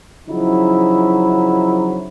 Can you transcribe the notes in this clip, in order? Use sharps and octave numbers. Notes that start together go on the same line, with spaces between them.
C#3 F3 F#3 D#4 E4